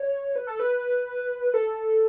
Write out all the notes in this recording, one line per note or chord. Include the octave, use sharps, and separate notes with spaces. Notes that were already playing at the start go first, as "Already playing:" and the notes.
Already playing: C#5
B4
A4
B4
A4